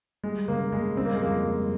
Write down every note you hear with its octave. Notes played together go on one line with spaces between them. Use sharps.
G3 G#3
C#3 A#3
C#3 G#3
G3 C4
A#3
G#3
F2 A#3
G3